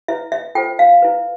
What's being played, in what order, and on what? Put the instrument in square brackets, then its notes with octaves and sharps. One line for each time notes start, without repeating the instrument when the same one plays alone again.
[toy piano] E4 B4 E5
E5
F4 A4 C5 G5
F5
E4 B4